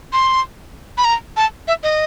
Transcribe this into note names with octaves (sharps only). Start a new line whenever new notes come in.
C6
B5
A#5
A5
E5
D#5